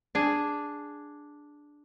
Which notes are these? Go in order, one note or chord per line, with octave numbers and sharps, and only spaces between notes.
D4 G#4